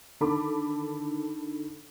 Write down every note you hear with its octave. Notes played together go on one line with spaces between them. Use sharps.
D3 D#3 A4 A5 B5 D6